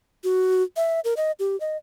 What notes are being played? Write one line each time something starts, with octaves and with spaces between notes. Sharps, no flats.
F#4
E5
A#4
D#5
G4
D#5